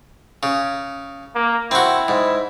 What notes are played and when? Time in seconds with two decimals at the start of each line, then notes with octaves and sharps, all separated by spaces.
0.43 C#3
1.35 A#3
1.71 C4 E4 F#4
2.08 G#2